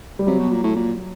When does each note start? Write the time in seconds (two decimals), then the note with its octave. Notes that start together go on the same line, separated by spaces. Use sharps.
0.19 G3
0.27 C3 F#3
0.39 B2
0.51 A#2
0.63 A2
0.76 A#2